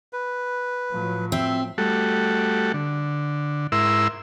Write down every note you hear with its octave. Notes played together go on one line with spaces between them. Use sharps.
B4
A2 F3 F#3
C4 E5
G3 A3 F#4 A4
D3
G#2 E4 A#4 E5 C6 E6